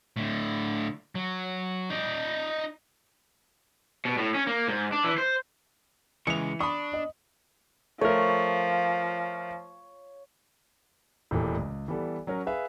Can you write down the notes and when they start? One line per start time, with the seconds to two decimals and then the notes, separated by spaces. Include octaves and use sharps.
0.17 A2 D3
1.15 F#3
1.90 D#4 D5
4.05 B2
4.18 A2
4.34 C#4
4.47 A#3
4.68 G#2
4.92 D4
5.04 E3
5.18 C5
6.27 C#3 E3 G#3 C#7 F7
6.60 D4 B5 C#6 D#6
6.93 D#5
8.01 F3 A3 A#4 C#5
11.31 E1 A#2 E3 A3 G4
11.57 C#2
11.88 E3 G3 B3 A4
12.27 F#3 C#4 A#4
12.46 G#4 B4 E5 F5